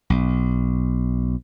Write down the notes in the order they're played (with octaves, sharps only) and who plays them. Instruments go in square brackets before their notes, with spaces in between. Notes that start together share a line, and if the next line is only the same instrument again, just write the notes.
[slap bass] B1